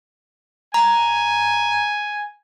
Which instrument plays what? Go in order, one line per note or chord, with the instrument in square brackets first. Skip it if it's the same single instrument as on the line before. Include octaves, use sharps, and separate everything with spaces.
[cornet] G#5 [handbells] A#5